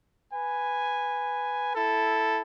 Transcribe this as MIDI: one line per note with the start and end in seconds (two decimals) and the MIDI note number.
0.33 1.74 71
0.33 1.74 80
1.74 2.42 64
1.74 2.42 69